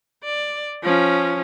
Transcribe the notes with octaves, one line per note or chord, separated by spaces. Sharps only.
D5
F3 C#4